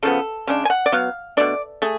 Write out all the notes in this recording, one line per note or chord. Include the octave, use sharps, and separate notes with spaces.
C#3 F3 B3 A4
C#3 G#3 D4
G#5
F#5
D5
F#3 B3 F5
B2 A3 D4 D5
A3 G#4